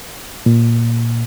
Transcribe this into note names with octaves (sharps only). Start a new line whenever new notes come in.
A#2